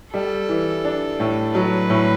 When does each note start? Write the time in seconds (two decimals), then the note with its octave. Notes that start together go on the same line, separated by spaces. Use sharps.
0.13 G3 A4
0.49 E3
0.85 D4
1.20 A2
1.55 F#3 B4
1.90 A2